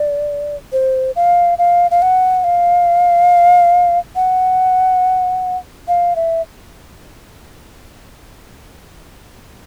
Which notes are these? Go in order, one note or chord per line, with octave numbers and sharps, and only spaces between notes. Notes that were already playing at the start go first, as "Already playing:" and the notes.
Already playing: D5
C5
F5
F5
F5
F#5
F5
F#5
F5
E5